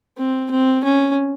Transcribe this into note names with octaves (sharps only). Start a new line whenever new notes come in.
C4
C4
C#4